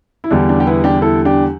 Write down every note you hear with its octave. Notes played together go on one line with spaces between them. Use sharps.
E4
E2 D3 G3 D4
D4
G4
B3 E4
D4 G4
E4 A4
D4 G4